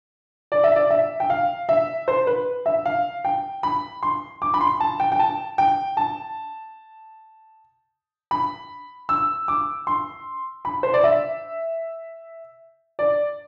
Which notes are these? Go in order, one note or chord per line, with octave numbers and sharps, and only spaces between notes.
D5
E5
D5
E5
G5
F5
E5
C5
B4
E5
F5
G5
B5
C6
D6
B5
C6
A5
G5
G5
A5
G5
A5
B5
E6
D6
C6
B5
C5
D5
E5
D5